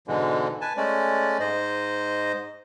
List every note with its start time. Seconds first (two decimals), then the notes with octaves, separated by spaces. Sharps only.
0.08 G#2 B2 D3 E3 G#3
0.61 B4 G#5 A5
0.77 G#3 A3 C#4 D5
1.40 G#2 C5 D#5